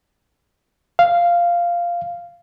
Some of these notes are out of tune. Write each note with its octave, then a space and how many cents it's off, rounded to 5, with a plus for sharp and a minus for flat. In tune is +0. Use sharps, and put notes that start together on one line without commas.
F5 -5